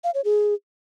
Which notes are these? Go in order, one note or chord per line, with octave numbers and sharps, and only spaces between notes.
F5
C#5
G#4